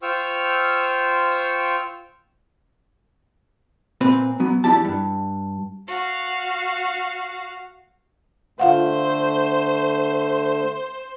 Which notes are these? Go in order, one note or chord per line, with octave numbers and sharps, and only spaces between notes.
F4 C5 G5 C#6 E6 F6
A#2 C4 B4
F#3 B3
E2 D4 E4 G4 A5
G2
F#4 F5
D3 A3 F4 C5 F5 F#5